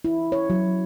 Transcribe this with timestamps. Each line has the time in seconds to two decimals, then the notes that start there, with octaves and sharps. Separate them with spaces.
0.05 E4
0.32 C#5
0.50 F#3